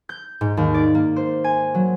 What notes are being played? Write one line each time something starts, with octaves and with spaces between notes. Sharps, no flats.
G6
G#2
D#2
D5
A#3
C5
G#5
F#3